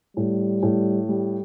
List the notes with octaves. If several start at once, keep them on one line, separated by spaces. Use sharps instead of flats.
A2 G3
A2
G3